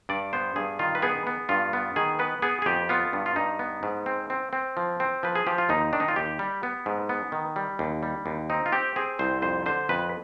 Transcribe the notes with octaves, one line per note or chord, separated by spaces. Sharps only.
G2 D5
B3 C5
G2 G#4
D#3 F4
B4
B3 G#4
B3
G2 F4
B3
D#3 G#4
B3 B4
B3 G#4
G#4
F2 G4
B3 F4
G2
F4
G2 D#4
B3
G#2
C4
C4
C4
F3
C4
F3 B4
G#4
F3 G4
F4
D#2 D#4
D#3 D4
D#4
F4
D#2 G4
G3
B3
G#2
B3
D#3
G3
D#2
G3
D#2
C4 D#4
F4
C4 G4
C4 G#4
C2 C5
F2 C5
D3 C5
F2 B4